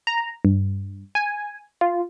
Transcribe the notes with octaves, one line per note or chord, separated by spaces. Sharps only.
A#5
G2
G#5
F4